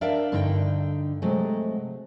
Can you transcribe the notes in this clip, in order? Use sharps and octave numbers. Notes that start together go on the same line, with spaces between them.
D4 A#4 D5 E5 F5 G5
G2 D3 D#4 B4 G5
C3 F#3 G#3 A3